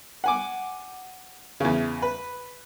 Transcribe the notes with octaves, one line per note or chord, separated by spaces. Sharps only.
F#5 G#5 D6
E2 C#3
B4